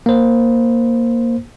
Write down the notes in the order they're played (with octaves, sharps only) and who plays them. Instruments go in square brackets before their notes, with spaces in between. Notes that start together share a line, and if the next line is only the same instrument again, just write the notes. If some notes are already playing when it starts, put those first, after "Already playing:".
[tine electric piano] A#3 C5